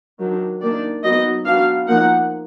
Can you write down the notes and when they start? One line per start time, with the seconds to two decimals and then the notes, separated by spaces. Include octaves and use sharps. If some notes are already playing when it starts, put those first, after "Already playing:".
0.20 D#3 F#3 D4
0.61 D#3 A#3 D4 D5
1.03 F#3 B3 D#4 D#5
1.45 F#3 B3 D4 F5
1.87 F3 A#3 D#4 F#5